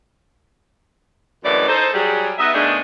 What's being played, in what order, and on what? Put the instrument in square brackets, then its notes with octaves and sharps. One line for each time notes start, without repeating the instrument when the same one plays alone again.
[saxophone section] F#2 A2 D3 E3 G#3 D5
D#4 A4 C5
F#3 G3 G#4
B3 D#4 B4 D#5 E5
B2 D#3 G#3 A3 D4